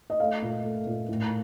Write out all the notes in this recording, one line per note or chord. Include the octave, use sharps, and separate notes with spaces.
D#5
A3 F5
A#2
A3
A#2
A2